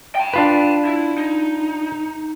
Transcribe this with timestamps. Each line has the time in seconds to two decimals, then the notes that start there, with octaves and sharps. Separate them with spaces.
0.15 G5 A5
0.34 D4 F4 B4
0.85 E4
1.18 D#4